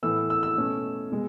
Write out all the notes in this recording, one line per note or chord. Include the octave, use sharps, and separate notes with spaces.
A2 E3 B3 E6
E6
E6
B2 A3 C#4
B2 G#3